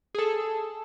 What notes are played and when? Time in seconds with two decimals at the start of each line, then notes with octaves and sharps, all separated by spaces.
0.15 G#4 A4